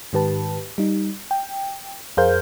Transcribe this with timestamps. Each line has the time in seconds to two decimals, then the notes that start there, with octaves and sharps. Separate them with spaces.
0.13 G#2 D#3 G4 B4 A5
0.78 G3 D#4
1.31 G5
2.17 F2 G#4 A#4 C5 F5 G6